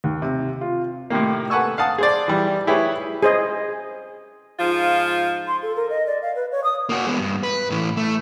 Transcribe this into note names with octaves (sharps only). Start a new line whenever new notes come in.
D#2
C3
F4
A2 C3 D#3 A#3
A4 B4 F#5 G#5 C#6 E6
F5 F#5 A5 D#6
G#4 C5 D5
E3 G3
E4 G4 G#4 B4 C#5
G#4 C5 D#5
G#2 F3 F4
C6
A4
A#4
D#5
D5
F5
B4
C#5
D#6
A#3 F#4
G#3 B3
G2
B4
A2 E3
A3